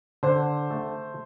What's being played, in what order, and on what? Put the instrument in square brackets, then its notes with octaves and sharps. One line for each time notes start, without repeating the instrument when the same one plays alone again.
[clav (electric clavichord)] D3 [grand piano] C5 C6
[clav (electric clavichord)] A3